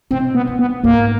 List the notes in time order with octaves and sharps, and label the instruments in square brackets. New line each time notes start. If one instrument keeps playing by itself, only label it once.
[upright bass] B2 [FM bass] C4
[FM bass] B3
[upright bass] A#2
[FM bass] B3
[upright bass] G#2 [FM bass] A#3